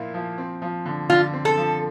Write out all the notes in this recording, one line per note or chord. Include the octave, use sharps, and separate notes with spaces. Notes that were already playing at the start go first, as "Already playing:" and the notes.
Already playing: A#2 F3 A#3 E4
F3
C4
F3
D3
D3 F4
C4
A4
F3